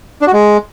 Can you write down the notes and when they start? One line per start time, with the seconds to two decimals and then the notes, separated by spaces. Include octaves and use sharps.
0.21 D4
0.27 F#4
0.33 G#3